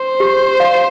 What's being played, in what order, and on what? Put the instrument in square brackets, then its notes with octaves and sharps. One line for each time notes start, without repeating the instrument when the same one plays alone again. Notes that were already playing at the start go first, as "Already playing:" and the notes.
Already playing: [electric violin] C5 [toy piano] C6
[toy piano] G4
F5